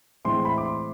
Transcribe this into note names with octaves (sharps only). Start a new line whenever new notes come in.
A2 E3 G#3 C4 E4 C6
B5
D6
C6